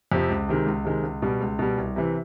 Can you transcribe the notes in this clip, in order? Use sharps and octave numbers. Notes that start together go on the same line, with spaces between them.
F2 C3 F3
C#2
C3 D#3 G#3
C#2
C3 D#3 G#3
C#2
B2 G3
C#2
B2 G3
C2
C3 E3